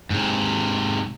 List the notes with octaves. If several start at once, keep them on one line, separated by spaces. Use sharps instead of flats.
G#2 C3